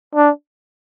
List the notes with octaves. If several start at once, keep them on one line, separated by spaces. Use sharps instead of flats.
D4